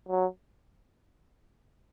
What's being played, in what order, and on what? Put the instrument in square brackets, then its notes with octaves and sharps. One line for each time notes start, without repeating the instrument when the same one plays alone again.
[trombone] F#3